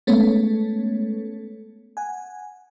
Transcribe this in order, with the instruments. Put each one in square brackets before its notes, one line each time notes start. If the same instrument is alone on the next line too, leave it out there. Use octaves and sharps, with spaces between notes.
[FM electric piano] G#3 A3 B3 C#4 A4 C#5
F#5 G#5